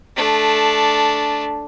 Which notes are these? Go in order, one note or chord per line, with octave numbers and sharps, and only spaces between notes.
A3 D4